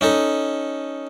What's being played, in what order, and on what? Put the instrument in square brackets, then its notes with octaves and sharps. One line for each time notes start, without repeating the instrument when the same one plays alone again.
[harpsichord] C#4 D#4 A4